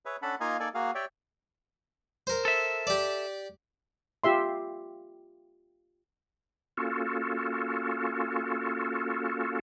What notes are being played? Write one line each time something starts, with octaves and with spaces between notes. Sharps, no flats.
G#4 B4 C#5 E5
C#4 D4 A4 F#5 A5 B5
A#3 D#4 F4 D#5 F5 G#5
A#3 D#4 A4 D5 G#5
A#3 F#4 G#4 F5
G4 C#5 D5 E5 G5
A#4 C5
A4 E5
G4 D5
F4 G4 E5 C6
A#3 C#4 F4 F#4 A4